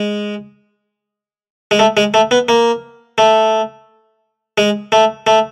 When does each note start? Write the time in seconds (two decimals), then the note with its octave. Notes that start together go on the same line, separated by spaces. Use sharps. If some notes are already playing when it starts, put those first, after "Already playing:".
Already playing: G#3
1.71 G#3
1.79 A3
1.97 G#3
2.14 A3
2.31 B3
2.49 A#3
3.18 A3
4.58 G#3
4.92 A3
5.27 A3